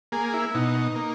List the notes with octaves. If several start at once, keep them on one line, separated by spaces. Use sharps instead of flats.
A#3 G#4
E4
B2 D#4
A#3